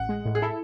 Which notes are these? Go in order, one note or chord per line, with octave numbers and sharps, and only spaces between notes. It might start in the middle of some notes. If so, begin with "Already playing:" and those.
Already playing: A1 F#5
G#3
A2
G#4
E4 A4